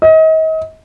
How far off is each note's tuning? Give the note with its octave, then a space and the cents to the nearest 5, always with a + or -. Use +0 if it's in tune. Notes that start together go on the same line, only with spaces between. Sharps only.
D#5 +35